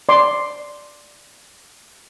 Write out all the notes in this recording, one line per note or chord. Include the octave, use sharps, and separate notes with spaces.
D5 C6 D6